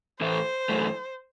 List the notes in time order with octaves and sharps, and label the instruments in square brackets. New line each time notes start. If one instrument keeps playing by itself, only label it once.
[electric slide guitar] A2 E3 A3 E4 [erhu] C5
[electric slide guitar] F#2 E3 A3